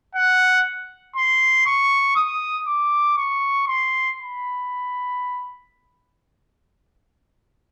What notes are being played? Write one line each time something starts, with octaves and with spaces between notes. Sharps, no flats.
F#5
C6
C#6
D#6
D6
C#6
C6
B5